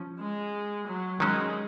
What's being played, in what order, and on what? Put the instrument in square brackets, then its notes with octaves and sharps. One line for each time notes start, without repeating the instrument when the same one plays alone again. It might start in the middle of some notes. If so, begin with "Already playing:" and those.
Already playing: [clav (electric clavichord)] F3 C#4
[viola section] G#3
F#3
[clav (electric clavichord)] D#3 F#3 C#4 [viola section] G#3